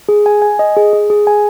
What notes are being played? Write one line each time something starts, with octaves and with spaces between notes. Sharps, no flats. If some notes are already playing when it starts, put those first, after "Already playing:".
G#4
G#5
G#5
D#5
G#4
G#4
G#4
G#5